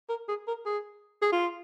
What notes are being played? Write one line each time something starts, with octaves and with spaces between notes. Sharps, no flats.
A#4
G#4
A#4
G#4
G#4
F4